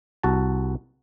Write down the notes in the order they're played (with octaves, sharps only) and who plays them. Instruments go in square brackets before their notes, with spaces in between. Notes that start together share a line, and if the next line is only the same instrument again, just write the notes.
[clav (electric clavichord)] C2 F#4 A5